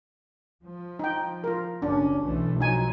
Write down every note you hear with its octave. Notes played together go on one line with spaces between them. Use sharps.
F3
D#4 G5
F4 A#4
F#1 C#4 D4
B1 E3 A3
F3 F#3 D#4 G#5